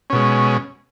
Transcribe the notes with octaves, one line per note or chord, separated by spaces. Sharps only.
B2 G#3 C#4